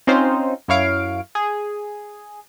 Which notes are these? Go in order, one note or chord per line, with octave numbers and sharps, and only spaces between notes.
C4 C#4 D#4 F4 C5
F#2 E4 C#5 F5 D7
G#4